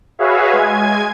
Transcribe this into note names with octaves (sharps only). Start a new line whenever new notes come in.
F#4 G#4 B4 C#5 E5 F5
G#3 G#5 G#6